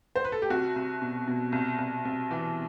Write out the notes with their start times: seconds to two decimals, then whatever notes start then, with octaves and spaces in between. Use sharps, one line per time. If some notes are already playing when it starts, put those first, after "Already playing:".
0.16 C5
0.24 B4
0.32 A4
0.42 G4
0.50 C2 F#4
0.76 C2
1.02 B2
1.28 B2
1.52 C2
1.78 C2
2.05 C2
2.31 E3